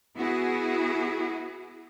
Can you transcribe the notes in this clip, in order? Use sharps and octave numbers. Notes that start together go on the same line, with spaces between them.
B3 E4 F#4 G#4